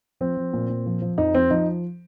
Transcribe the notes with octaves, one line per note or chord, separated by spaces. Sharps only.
F3 C4
F3
A#2
A#2
F3
F3
F2 D#4
F3 C4
F3 D#4